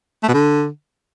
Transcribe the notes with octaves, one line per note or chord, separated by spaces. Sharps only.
A3
B2
D3